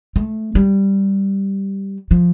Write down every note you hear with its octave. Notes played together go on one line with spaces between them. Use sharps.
A3
G3
F3